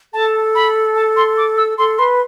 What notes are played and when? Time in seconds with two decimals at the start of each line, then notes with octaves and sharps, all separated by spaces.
0.13 A4 A5
0.55 B5
0.96 A5
1.16 C6
1.37 D6
1.57 E6
1.78 A4 C6
1.98 B4 C6